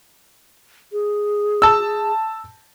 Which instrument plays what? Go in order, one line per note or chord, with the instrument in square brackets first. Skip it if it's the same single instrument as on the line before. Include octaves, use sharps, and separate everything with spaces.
[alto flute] G#4
[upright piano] A5 E6